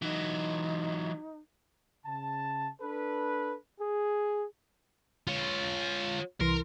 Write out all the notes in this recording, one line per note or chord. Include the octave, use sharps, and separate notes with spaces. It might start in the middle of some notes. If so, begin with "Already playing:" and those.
E3 F#3 D#4
C#3 A5
D4 A4 B4
G#4
F4 C#5
C2 E3 A#4 C6